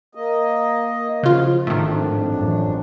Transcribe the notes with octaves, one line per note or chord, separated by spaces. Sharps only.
A#3 D#5
C#3 F3 F4
G#1 F2 A2 D#3 D4
A1 F#2